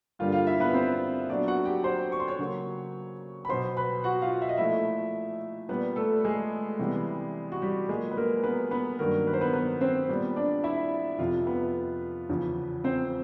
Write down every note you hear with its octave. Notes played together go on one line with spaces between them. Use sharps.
G2 D3 G3 A#3 F4 F5
F4 F5
E4 E5
B3 B4
C4 C5
A#2 F#3 B3 D4 D5
F#4 F#5
G4 G5
C5 C6
C#6
C6
C#5 C#6
C#3 F#3 A#3
B5
B2 F#3 B3 C5 C6
B4 B5
F#4 F#5
F4 F5
E5
D#5
A#2 F3 A3 E4 E5
A#2 G3 B3 B4
A3 A4
G#3 G#4
C3 E3 G3 B3
F#4
G3 G4
A#2 F#3 G#3 A#3 G#4
B4
A#3 A#4
B3 B4
B3 B4
G2 D#3 F#3 A#3 A#4
B4
C5
B3 B4
B3 B4
C4 C5
A#2 G3 B3
D4 D5
E4 E5
F2 C3 F3 F4 F5
B3 B4
E2 C#3 F3
C4 C5